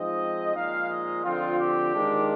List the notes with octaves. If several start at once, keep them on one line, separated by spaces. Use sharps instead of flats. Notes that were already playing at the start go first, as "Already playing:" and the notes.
Already playing: F3 G#3 C4 D#4 D#5
A#2 F3 G#3 D#4 F5
D#5
D3 F3 C4 F4
G4
D#3 G#3 D4 F4